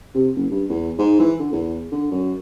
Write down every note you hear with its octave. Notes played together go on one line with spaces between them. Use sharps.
C3
F#1
G2
E2
G#2
E3
D3
E2
D3
F#2